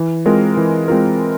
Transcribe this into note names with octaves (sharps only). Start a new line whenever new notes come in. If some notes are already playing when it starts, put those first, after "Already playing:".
Already playing: E3
G#3 C4 F4 A#4
E3
G#3 C4 F4 A#4